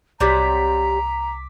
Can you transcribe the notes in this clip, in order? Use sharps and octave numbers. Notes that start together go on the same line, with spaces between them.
C2 C3 F#3 G3 A#5 D6 B6